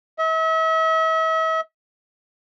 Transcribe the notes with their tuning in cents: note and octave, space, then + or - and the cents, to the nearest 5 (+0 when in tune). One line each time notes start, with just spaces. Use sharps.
E5 -40